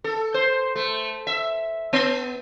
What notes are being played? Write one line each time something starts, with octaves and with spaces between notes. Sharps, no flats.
A4
C5
A3
E5
B3